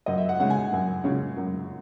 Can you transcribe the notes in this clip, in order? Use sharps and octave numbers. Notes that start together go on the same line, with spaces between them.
F#2 D#5
E5
F#5
C#3 G#3 C#4 F#5
G#5
F#2
C#3 G#3 C#4
F#2